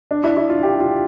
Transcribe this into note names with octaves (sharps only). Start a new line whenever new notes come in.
D4
E4
E4
F4
G4
F4